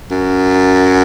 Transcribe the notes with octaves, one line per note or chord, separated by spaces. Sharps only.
F#2